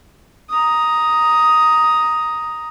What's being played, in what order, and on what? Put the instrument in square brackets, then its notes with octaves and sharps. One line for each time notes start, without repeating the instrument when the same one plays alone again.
[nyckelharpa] A#5 D#6